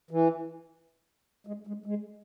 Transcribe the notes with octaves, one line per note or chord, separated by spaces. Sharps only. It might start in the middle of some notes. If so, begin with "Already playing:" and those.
E3
G#3
G#3
G#3